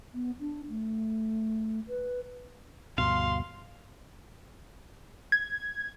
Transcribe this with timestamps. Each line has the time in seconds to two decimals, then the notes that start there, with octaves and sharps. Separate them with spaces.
0.14 B3
0.40 D4
0.69 A3
1.88 B4
2.98 D2 G2 B2 F5 C6
5.32 G#6